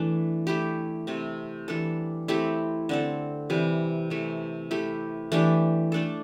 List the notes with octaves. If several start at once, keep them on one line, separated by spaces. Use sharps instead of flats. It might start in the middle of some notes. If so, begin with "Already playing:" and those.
Already playing: E3 A3 D4
A3 E4 G4
C3 A3 C4
E3 G3 D4 A4
A3 C4 E4 G4
D3 C4 A4
C3 E3 G3
C3 E3 A3
A3 E4 G4
E3 A3 D4 G4
A3 D4 A4